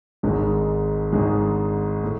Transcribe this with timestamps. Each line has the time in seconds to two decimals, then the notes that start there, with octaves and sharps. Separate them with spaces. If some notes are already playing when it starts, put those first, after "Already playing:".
0.23 G#1 G#2 G#3
1.12 G#1 G#2 G#3
2.04 A2